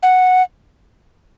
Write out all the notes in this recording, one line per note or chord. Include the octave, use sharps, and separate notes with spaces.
F#5